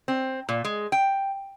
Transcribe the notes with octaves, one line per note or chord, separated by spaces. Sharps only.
C4
A#2
G#3
G5